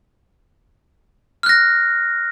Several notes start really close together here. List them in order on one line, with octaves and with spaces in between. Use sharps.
F6 F#6 A#6